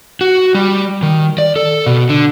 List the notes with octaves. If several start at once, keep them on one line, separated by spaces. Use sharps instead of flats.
F#4
G3
D#3
D5
A4
B2
D3